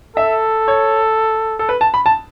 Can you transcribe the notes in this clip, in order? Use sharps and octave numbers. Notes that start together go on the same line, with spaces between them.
A4 E5
C#5
A4
B4
A5
B5
A5